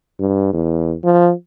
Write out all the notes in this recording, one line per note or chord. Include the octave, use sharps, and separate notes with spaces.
G2
E2
F3